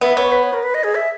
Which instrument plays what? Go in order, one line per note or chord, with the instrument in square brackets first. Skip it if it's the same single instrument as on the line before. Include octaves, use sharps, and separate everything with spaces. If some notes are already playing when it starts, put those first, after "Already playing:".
[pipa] B3 [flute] E5
[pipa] B3 [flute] C#5
[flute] B4
C#5
A#4
B4
D#5
G#4
E5